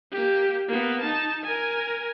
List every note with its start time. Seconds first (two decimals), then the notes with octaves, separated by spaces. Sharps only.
0.12 A#3 G4
0.69 A#3 B3
1.01 D#4 A5
1.44 A#4 G#5